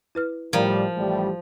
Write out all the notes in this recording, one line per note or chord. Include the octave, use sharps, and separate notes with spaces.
E4 B4 F6
A2 F3 G3 A#4 F5 A#5
A1 A2 G3